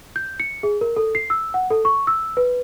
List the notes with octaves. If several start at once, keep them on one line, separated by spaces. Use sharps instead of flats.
G6
C#7
G#4
A#4
A4
C7
E6
F#5
A4
C#6
E6
B4